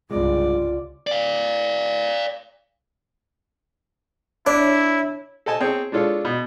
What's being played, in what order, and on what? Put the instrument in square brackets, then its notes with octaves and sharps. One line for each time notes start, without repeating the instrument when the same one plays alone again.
[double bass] C2 C#3 [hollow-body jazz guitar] G2 G#3 [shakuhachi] F4 [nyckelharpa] D5
[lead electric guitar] D5 F5
[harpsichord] D4 [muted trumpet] E4 [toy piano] C#5
[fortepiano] A4 D#5 G#5 A5
C4 G#4 C#5
G#3 D4 F4 A4 C#5
B2